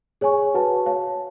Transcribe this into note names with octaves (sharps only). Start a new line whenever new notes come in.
G#4 C#5 G#5 C#6
F#4 B4 F#5 A5
C#5 F5 A5